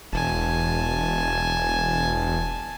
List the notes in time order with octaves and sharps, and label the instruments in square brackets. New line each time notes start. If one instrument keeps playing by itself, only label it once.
[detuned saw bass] E1 [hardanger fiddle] G#5 A5